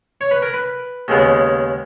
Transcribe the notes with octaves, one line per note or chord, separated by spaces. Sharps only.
C#5
B4
A#4
B4
D#2 C#3 G#3 B3